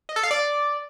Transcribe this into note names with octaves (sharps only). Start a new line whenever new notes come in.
D#5
A4
F5
D5